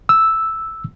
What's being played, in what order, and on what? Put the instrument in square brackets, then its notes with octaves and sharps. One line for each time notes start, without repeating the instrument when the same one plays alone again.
[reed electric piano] E6